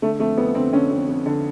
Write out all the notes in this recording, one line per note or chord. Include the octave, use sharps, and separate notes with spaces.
D3 A3
F2 A3
F2 B3
D3 C4
D3 C#4
F2
F2
D3